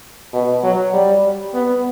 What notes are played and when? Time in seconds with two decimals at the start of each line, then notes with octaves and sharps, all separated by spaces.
0.33 B2
0.63 F#3
0.94 G3
1.54 B3